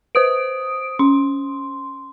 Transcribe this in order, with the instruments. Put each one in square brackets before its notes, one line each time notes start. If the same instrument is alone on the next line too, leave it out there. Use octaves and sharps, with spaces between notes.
[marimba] B4 [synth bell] C5 D#6 D7
[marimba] C#4 [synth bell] C6